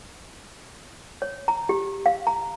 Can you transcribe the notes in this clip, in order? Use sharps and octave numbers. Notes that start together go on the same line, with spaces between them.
C#5
A#5
G4
F5
A#5